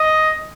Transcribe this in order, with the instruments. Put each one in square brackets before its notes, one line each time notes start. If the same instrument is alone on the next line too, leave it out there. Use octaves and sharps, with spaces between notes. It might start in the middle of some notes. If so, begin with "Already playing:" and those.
Already playing: [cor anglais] D#5